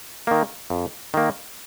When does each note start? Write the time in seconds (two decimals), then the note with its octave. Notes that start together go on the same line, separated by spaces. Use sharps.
0.27 D#3 A#3
0.70 F2
1.14 D#3 A#3